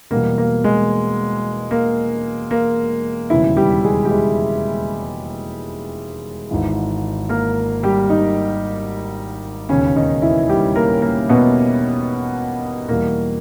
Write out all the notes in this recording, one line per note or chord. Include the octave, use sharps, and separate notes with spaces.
E1 E2 B2 G3 A#3
A#3
G#3
A#3
A#3
E1 D#2 C#3 E3 G3 E4
G3 G4
G#3 G#4
G4
G#3 G#4
G#1 G#2 E3
A#3 A#4
G3 G4
D#3 D#4
E1 D#2 C#3 C#4
D#3 D#4
E3 E4
G3 G4
A#3 A#4
A#3 A#4
B2 B3
E2 B2 G3 A#3